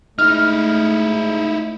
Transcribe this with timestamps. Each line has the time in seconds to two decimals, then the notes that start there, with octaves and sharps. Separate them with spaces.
0.19 G#2 A3 D#4 E4 F6